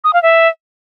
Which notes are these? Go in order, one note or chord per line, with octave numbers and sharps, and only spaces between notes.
D#6
F5
E5